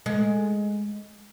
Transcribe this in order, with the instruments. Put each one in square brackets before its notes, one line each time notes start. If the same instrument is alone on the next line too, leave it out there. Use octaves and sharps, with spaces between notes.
[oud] G#3